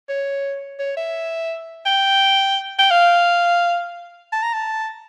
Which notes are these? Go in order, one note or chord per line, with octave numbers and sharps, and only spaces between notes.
C#5
C#5
E5
G5
G5
F5
A5
A#5
A5